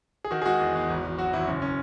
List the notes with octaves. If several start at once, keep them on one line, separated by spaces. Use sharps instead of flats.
G#4
D#3 F#4
G#4
G#3 F#4
E2
E2
G#1
G#1
F#3 F#4
G#1 E4
F#1 C#4
C#4